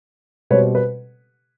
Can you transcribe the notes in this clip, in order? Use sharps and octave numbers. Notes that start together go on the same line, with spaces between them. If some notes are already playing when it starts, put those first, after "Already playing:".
B2 G3 C4 B4 C#5
B4